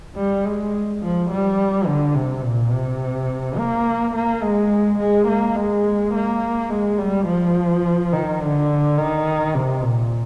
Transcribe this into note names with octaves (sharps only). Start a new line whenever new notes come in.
G3
G#3
F3
G3
D3
C3
A#2
C3
A#3
A#3
G#3
G#3
A#3
G#3
A#3
G#3
G3
F3
D#3
D3
D#3
C3
A#2